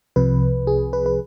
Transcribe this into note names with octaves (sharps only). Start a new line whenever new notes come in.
C2 C3 F3 B4
G#4
B4
B4